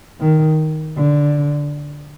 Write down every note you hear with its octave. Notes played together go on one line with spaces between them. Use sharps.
D#3
D3